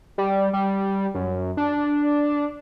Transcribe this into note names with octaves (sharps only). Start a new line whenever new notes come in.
G3
G3
F#2
D4